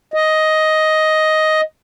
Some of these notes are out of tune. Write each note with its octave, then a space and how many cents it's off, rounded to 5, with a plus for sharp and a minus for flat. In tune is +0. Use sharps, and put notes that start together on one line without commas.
D#5 +5